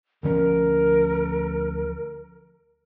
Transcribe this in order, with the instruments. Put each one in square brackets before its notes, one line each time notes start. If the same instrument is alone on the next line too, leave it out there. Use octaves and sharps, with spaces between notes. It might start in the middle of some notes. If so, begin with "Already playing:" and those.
[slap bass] D2 F3 C#4 [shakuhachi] A#4